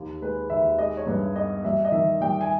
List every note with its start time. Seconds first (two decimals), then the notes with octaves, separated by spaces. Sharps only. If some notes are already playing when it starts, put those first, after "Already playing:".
Already playing: D#2
0.22 G#3 B4
0.50 D#2 E5
0.78 G#3 D#5
0.97 C#5
1.07 G2 B4
1.35 B3 D#5
1.64 G3 E5
1.85 D#5
1.92 D#3 E5
2.21 G3 G5
2.41 G#5